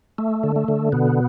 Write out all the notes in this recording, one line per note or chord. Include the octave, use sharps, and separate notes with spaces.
A3
D3
A3
D3
B2 B3